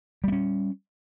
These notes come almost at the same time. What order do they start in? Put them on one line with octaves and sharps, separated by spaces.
G3 B3 C#4